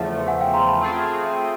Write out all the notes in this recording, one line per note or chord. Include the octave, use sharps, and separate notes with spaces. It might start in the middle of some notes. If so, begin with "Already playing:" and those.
Already playing: E2 C#3 F3 A3 E5 F#5
F#5 G#5
F5 G5
A#5 C6
A5 B5
A3 C4 F4 G#4